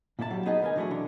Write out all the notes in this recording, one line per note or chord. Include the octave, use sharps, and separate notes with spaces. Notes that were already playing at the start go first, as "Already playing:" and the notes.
A#2 A#3 E4 C#5 A5
F#3 G3
B3 D#4 G#4 B4 D#5 F#5
D2 B3 A#4 D#5 G#5
D3 E3 F#3 A3 E4 G#4
B2 D3